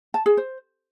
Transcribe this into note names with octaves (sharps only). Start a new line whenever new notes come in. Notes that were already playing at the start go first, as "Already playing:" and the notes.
A5
G#4
C5